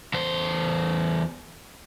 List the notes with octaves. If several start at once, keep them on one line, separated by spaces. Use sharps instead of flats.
E2 C5